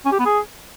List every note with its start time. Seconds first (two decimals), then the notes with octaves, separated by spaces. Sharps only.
0.06 C#4
0.12 G4
0.19 B3
0.26 G#4